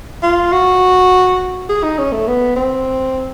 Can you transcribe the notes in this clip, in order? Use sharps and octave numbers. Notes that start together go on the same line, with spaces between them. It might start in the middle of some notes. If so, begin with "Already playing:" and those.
F4
F#4
G#4
D#4
C#4
A3
B3
C4